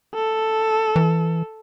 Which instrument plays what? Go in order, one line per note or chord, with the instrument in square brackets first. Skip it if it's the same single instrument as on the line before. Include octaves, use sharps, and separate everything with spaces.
[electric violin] A4
[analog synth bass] E3